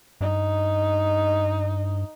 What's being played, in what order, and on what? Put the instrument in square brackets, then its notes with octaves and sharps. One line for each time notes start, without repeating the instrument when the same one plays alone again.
[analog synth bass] G2 [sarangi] D#4